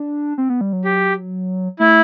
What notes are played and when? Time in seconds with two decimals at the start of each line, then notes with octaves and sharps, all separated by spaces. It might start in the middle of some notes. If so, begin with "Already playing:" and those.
Already playing: D4
0.38 C4
0.50 B3
0.61 G3
0.73 F#3
0.85 G4
1.80 A3 E4